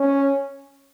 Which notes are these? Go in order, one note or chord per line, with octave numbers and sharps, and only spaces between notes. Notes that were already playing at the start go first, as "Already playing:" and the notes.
Already playing: C#4